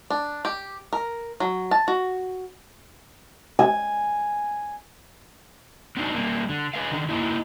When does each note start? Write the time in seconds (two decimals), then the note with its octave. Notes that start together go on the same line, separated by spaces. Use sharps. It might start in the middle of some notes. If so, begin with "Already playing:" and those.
0.10 D4
0.45 G4
0.93 A#4
1.40 F#3
1.71 A5
1.88 F#4
3.59 G#5
5.97 B3 C4 D4 D#4
6.14 G3 A#3
6.49 D3
6.74 B4 D#5 F5
6.91 D3 D#3
7.09 A#3 B3 D#4 E4